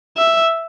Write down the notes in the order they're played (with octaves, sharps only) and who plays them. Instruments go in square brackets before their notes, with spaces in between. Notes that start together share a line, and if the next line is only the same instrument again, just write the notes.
[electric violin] E5